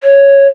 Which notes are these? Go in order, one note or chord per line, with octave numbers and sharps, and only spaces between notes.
C#5